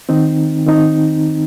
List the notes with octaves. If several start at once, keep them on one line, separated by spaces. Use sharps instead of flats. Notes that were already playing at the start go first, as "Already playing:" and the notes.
D#3 C4 D#4
D#3 C4 D#4